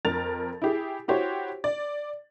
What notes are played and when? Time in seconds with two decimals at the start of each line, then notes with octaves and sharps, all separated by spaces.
0.05 F2 A#4 A6 F7
0.62 E4 G4 G#4
1.08 E4 F#4 G4 C5 C#5
1.64 D5